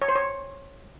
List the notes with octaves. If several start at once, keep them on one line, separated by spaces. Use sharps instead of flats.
C#5
C5
C#5